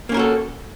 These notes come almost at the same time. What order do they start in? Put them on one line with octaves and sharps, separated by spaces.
A#3 C#4 A#4 F#4 A4